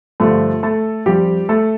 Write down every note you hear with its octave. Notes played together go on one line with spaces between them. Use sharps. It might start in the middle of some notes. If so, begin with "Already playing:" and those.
G2 D3 F3 A3 A4
A3 A4
F2 F3 G3 G4
A3 A4